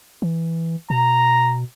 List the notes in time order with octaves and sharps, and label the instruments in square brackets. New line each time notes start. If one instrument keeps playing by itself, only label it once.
[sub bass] E3
[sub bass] B2 [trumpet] A#5